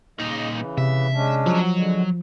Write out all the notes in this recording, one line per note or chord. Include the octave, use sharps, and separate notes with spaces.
A#2 C#3 D#4 D#5
C#3 E3
C3 E5
G#3 C#4 D4
F3 F#3
D3 G#3